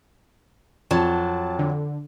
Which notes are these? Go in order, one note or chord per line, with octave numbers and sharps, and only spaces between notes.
F2 F#3 A5
D3